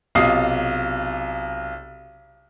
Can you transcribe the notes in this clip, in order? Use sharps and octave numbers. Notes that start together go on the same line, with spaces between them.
B1 C3 F4 D#5 D#6 C7